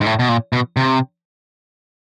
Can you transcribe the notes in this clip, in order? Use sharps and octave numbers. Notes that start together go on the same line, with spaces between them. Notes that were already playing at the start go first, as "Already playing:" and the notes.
G#2
A2
B2
A#2
B2
C3